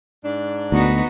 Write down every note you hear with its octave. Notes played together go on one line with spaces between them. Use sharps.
G#2 D4
D2 B3 D#4 F#4